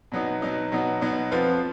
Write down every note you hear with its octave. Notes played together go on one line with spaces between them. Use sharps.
B2 F#3 B3 D#4
B2 F#3 B3 D#4
B2 F#3 B3 D#4
B2 F#3 B3 D#4
F2 F3 B3 F4 B4